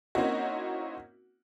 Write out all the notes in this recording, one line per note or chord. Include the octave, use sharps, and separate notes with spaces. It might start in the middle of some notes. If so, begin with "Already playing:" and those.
A#3 C4 C#4 D#4 E4 F#4